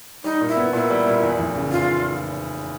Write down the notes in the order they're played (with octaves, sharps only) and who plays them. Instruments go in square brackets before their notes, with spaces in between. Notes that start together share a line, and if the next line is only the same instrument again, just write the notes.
[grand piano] G3 [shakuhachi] D#4
[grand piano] A#2
[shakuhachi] E4
[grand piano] B3
[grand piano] A#2 [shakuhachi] E4
[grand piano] G3
A#2
E2
F1
C#3
[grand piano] F1 [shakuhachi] F4